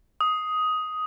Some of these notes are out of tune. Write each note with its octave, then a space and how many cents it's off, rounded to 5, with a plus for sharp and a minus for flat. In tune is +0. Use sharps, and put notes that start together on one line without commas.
D#6 +10